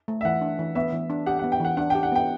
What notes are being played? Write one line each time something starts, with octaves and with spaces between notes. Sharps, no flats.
A3
E5
E3 F#5
D4
E3
B3 E5
E3
D4
G4 F#5
B3 F#5
G5
E3 F#5
D4 F#5
G4 G5
F#5
B3 G5